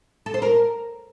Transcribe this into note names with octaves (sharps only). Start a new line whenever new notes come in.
A4
C5
A#4